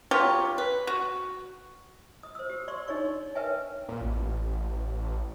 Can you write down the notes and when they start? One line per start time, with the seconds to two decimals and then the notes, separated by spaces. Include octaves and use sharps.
0.11 F#3 F4 G4 C#5
0.58 B4
0.87 F#4
2.23 D#6
2.35 C5 E6
2.50 G4
2.68 D5 C6 C#6 E6
2.88 D4 D#4 G#4 C#5 D5 C#6
3.35 A#4 B4 C#5 E5 G5 G#5
3.89 A#2
4.01 A1